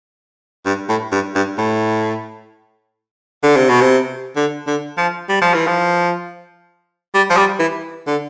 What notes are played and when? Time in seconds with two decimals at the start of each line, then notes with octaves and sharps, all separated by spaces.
0.66 G2
0.89 A2
1.12 G2
1.35 G2
1.58 A2
3.44 D3
3.57 C3
3.69 B2
3.81 C3
4.36 D3
4.67 D3
4.98 F3
5.29 G3
5.42 F3
5.54 E3
5.67 F3
7.14 G3
7.30 F3
7.37 G3
7.60 E3
8.07 D3